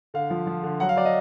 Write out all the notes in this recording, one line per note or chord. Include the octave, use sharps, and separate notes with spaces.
D3 F5
F3
F3
D3
F#3 F#5
F5
F#3 D5
D#5